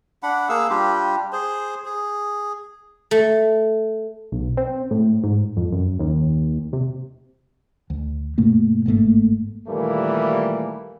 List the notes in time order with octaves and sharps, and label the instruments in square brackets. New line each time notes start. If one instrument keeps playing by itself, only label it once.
[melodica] D4 F#5 B5
A#3 G#4 F5 E6
G3 D4 F4 G4
G#4 C5
G#4
[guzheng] A3
[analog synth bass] B1
C4
A2
G#2
F2
F#2
D#2
C3
[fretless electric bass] D2
G2 B2 A3 A#3
G1 G#2 A3 A#3
[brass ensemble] D#2 A#2 E3 G3 A3 A#3